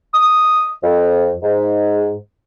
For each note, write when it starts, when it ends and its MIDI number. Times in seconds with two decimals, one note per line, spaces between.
0.14 0.70 87
0.83 1.34 41
1.43 2.15 44